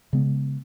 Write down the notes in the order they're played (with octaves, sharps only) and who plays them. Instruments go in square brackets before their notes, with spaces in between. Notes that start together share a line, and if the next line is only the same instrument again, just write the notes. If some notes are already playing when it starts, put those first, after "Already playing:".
[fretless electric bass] C#3 G#3 B3